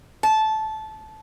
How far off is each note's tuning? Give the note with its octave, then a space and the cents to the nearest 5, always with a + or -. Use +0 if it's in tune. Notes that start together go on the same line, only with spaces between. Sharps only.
A5 -15